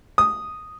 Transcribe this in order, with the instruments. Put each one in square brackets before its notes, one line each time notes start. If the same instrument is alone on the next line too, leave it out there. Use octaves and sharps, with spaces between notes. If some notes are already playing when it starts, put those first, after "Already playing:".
[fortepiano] D#6